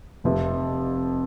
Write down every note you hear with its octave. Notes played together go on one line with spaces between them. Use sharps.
F1 F2 C3